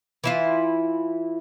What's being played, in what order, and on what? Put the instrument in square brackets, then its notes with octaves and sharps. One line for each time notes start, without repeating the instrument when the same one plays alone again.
[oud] E3 E4 F4